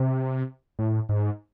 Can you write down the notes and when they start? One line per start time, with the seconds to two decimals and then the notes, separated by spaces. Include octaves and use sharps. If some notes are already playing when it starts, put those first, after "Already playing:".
Already playing: C3
0.79 A2
1.09 G#2